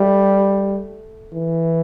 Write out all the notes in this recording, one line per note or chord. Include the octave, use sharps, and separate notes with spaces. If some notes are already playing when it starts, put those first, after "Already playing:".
Already playing: G3 A3
E3